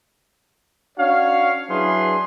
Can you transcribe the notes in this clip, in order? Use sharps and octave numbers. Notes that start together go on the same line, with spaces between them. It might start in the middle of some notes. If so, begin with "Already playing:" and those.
C#4 D4 F#4 C#5 F5
F#3 D4 E4 G#4 B4 C6